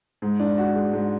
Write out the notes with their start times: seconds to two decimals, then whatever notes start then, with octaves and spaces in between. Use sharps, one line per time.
0.22 G#2
0.40 D4
0.58 F#4
0.76 G#3
0.93 G#2